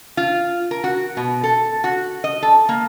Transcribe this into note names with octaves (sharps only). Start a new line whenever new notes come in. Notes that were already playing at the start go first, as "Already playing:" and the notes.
F4
A#4
F#4
B2
A4
F#4
D#5
A4
A#3